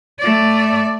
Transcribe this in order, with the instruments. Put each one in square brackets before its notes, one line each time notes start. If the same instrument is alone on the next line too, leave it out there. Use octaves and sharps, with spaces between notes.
[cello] A3 D5